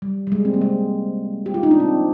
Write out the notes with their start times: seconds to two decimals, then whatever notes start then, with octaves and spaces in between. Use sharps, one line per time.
0.02 G3
0.27 G3
0.32 G#3
0.45 C4
0.54 A#3
0.61 G#3
1.46 G4
1.54 F4
1.63 D#4
1.71 D4
1.80 C4